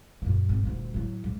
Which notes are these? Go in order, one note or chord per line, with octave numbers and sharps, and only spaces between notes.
F#2 A#2
G#1
D#1 D2
A2 F#3
C#2